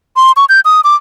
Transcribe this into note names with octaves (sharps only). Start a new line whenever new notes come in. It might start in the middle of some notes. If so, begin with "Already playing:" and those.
C6
C#6
G6
D#6
D6